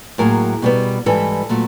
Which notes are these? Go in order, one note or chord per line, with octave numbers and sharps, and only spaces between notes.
A2 F#3 A#3 G#4 A#4
B2 G3 B3
G#2 E3 G3 A4 B4
A#2 F#3 A3